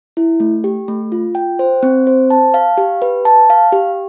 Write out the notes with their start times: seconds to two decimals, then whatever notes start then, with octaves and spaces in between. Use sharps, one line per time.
0.17 E4
0.40 A3
0.64 G4
0.88 A3
1.12 F4
1.35 G5
1.59 C5
1.83 C4
2.07 C5
2.30 A5
2.54 F5
2.77 G4
3.02 B4
3.25 A5
3.50 F5
3.72 G4